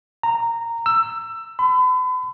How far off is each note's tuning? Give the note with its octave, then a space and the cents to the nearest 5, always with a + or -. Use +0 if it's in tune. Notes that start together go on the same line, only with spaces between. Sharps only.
A#5 -10
E6 +20
B5 +40